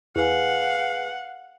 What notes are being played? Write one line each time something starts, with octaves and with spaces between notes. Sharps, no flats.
E2 G#4 B4 F5 F#5 G#5